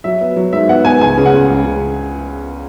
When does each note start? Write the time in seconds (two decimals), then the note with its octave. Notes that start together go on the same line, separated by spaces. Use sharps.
0.04 F#3 E5
0.21 B3
0.36 F#3
0.53 G#2 E5
0.69 B3 F#5
0.85 B3 G#5
1.01 C#2 G#5
1.17 C#3
1.26 F#5
1.34 C#2
1.50 C#2
1.66 C#3